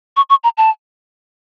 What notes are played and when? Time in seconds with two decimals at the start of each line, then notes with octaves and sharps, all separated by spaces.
0.17 C#6
0.30 C#6
0.44 A#5
0.58 A5